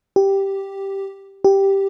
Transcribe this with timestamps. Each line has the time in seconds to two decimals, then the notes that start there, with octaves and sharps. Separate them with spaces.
0.16 G4
1.44 G4